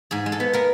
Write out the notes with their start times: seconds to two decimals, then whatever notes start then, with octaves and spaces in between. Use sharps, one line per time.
0.11 G#2 G#4
0.26 G#3
0.32 A4
0.40 B3
0.53 B3 A#4